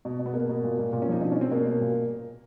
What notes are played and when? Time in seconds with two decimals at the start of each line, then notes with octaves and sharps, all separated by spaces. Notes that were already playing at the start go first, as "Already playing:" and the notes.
0.05 B2
0.19 B2
0.26 B3
0.34 B2 A#3
0.49 B2
0.64 A#2
0.78 A#2
0.93 A#2
1.02 C#4
1.08 F3 D#4
1.22 B2 D4
1.32 C#4
1.36 B2 C4
1.51 B2 A#3
1.67 B2
1.81 A#2